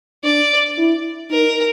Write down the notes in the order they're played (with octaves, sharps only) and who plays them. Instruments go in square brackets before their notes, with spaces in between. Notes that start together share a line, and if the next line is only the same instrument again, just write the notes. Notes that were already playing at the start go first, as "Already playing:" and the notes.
[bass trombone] D4 [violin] D5
[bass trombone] E4
[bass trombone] D#4 [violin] A#4